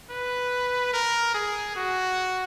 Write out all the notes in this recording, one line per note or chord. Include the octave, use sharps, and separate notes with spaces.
B4
A#4
G#4
F#4